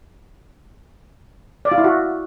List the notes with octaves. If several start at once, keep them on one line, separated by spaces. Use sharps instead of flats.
D5
F4
E4
F#4